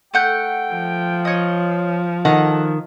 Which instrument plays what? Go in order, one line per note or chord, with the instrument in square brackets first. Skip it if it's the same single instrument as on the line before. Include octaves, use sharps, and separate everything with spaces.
[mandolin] A3 F#5 G6 [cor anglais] G5
[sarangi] F3
[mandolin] C#5 D#5
[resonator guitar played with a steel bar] D#3 [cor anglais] A4 [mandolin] F#5